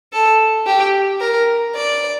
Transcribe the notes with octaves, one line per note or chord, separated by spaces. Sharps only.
A4
G4
A#4
D5